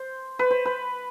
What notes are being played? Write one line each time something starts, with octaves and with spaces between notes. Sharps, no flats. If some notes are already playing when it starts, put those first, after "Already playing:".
Already playing: C5
B4
C5
B4